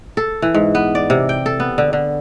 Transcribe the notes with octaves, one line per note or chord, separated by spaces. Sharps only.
A4
E3
G#2
B3
D5
C3
G5
A4
B3
D3
D3